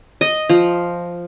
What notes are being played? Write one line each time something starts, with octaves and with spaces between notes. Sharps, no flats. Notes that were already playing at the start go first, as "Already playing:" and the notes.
D#5
F3